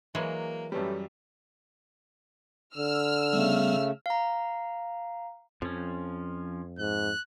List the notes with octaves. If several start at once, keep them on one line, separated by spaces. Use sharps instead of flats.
E3 F#3 G#3 A#3
F#2 G3 A3 C#4 G4 B4
D3 E6 F6
C#3 G3 A3 B3
F5 A#5
F2 F3 C#4
G#2 F#6